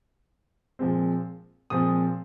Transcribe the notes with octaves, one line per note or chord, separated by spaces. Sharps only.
A#2 F3 G#3 C4
A#2 F3 G#3 C4 D#6